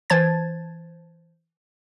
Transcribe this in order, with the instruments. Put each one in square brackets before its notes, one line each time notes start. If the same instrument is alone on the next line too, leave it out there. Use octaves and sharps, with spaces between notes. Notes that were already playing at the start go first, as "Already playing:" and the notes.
[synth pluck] E3 C5 A5 G#6 A6